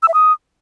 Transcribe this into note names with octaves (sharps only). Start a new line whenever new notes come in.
E6
E5
D#6